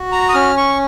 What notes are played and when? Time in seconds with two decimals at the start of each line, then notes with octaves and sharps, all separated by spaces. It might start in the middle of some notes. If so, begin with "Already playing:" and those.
Already playing: F#4
0.12 A#5
0.29 D#6
0.34 C#4 F6
0.57 C#6